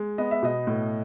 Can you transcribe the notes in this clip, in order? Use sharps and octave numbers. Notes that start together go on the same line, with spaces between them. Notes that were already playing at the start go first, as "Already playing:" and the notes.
Already playing: G#3
B3 D#5
E5
B2 D#5
A2